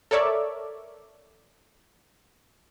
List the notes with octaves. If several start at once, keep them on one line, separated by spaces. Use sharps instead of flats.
A4 A#4 C#5 D5 E5